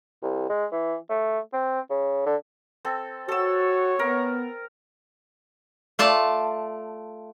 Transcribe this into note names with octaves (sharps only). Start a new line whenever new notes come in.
C2
G#3
E3
A3
C4
C#3
D3
C4 A4
F#4 A4 C#5 E6
B3 A#4
A3 F4 D5 A5